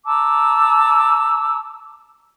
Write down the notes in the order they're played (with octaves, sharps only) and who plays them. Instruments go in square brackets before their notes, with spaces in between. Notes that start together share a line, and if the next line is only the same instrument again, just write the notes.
[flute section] A5 A#5 D6 E6